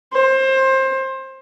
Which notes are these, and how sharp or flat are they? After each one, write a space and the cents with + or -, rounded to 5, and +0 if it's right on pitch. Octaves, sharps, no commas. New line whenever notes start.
C5 +25